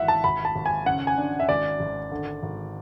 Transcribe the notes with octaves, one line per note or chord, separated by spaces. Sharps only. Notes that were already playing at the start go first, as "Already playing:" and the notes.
Already playing: G#1 E3 E5 F#5
A5
G#1 B5
A5
G#1
G#5
C#3 F#5
G#5
D4
E5
G#1 D5
G#1
D3
G#1